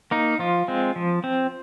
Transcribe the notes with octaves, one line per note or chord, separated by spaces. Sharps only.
A#3 D#4
F3 F4
G#3 C4
F3
C4